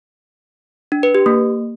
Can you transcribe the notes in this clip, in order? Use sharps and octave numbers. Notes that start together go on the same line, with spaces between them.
D4
B4
G4
A#3